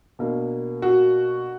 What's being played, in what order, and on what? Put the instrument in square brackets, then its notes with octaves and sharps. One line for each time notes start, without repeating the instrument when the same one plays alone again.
[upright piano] B2 A#3 D4
F#4